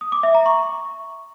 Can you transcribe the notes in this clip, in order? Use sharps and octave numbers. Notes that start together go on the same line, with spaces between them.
D#6
D6
E5
A#5
C#6